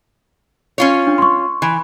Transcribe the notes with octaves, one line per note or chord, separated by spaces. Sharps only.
C#4 F4 C#5
D4
C6 C#6
E3